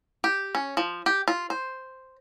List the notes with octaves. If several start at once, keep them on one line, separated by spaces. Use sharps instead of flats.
G4
C#4
F3
G4
F4
C5